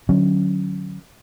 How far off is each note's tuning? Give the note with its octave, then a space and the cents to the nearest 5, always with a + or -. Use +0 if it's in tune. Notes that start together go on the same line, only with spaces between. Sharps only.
D3 +30 F#3 +0 C#4 +0